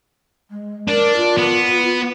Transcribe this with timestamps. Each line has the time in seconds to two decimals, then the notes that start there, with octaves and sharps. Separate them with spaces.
0.51 G#3
0.88 D4 A#4
1.17 F4
1.38 B3